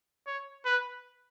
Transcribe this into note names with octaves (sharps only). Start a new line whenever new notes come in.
C#5
B4